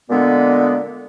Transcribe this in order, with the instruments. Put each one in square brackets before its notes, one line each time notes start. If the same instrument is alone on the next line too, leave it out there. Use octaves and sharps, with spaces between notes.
[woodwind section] A#2 D3 G#3 B3